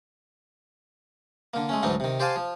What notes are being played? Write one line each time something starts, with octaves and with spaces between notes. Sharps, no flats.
D3 A#3
G#3 A3 C#4
D2 G#2 E3 F#3 D4 D#4
C3 D#3
G4 C5 D5 F5 G#5 A5
F3